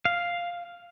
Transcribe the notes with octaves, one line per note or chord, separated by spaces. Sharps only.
F5